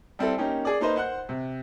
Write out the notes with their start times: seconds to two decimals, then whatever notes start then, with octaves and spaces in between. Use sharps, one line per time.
0.19 G3 C4 E4 A4
0.38 A#3 C#4 D#4 G4
0.65 G#4 D5
0.81 A#3 D#4 B4 C5 D#5
0.96 C5 F#5 F#6
1.29 C3